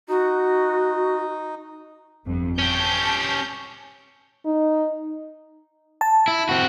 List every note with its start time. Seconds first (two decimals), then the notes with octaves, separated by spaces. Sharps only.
0.09 D#4 F#4
2.25 G1 F2
2.59 C#4 G4 A5 G6
4.45 D#4
6.01 A5
6.28 E4
6.49 C4 F#4